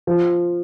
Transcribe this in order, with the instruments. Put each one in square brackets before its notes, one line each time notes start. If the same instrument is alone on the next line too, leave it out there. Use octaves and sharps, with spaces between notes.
[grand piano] F3